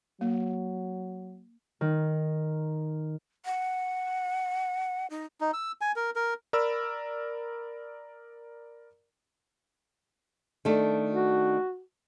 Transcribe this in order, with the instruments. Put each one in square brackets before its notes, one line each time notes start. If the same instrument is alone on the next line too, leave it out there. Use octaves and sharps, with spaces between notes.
[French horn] F#3 [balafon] A#3
[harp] D#3
[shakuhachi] F#5
D#4
[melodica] D#4
E6
G#5
A#4
A#4
[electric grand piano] A#4 D5 B5 E6
[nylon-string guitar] D#3 A3 D4
[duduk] F#4